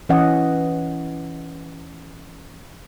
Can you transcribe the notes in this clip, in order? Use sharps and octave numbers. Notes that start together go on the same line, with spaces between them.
E3 C#4 D#5 F#5